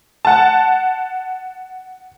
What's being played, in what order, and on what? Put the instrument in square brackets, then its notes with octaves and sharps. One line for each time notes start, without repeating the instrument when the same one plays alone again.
[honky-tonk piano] F#5 A5